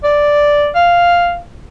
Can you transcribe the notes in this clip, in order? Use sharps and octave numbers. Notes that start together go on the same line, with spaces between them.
D5
F5